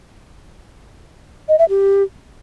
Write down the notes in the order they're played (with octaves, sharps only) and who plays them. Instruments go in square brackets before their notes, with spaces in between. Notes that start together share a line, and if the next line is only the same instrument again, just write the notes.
[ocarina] D#5
E5
G4